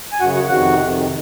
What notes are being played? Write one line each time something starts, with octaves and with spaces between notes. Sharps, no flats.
G#5
F#2 C#3 F#4 F#5
F#4 F#5
F2 C3 D#3 F#4 F#5
F2 C3 D#3
D#3